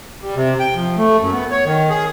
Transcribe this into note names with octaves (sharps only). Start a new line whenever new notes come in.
G3
C3
G5
F3
A3
F#2
B3
C#5
D#3
G#4